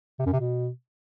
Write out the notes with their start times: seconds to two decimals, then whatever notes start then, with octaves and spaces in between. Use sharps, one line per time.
0.19 C3
0.26 F#2
0.33 C3
0.40 B2